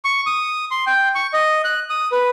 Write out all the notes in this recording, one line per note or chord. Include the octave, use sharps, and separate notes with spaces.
C#6
D#6
C6
G5
C#6
D#5
F#6
D#6
B4